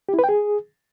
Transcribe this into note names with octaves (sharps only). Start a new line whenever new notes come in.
G4
E4
B4
G5
G#4